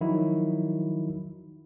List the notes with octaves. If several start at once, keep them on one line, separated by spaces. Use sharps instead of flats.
D#3 F3 F#3 D#4 E4 F#4